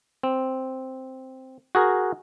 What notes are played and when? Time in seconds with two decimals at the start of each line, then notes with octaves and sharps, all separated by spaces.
0.23 C4
1.75 F#4 G#4 A#4